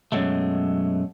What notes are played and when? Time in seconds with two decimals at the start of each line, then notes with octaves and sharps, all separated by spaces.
0.12 F#2 B2 F#3 G#3 A3